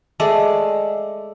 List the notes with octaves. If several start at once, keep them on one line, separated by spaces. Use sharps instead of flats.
G#3 A3 D5